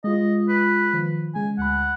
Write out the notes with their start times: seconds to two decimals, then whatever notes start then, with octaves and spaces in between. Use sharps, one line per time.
0.04 G#3 F4 D#5
0.49 B4
0.93 D#3 F3
1.35 C#3 G#3 G#5
1.58 D2 F#5 B5